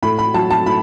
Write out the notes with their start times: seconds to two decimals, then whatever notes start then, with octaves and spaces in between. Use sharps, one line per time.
0.03 A2 B5
0.19 B5
0.34 F#3 A5
0.51 A5
0.66 A2 B5